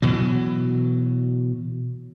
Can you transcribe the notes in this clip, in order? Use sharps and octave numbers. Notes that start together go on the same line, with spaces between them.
B2 E3 F#3